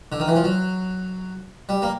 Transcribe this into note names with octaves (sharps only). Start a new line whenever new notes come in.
D3
D#3
E3
F3
F#3
G3
A#3